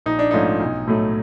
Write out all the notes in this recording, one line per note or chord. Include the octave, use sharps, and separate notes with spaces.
A#1 D#4
D4
G#2 F3 A3 C#4 D#4
B1
A2 F#3 A3